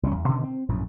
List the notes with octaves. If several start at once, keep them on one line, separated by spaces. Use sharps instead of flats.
C2 G3 G#3 C#4
E2
B2 D3 D#3 C#4
C4
A#1 F#2 A2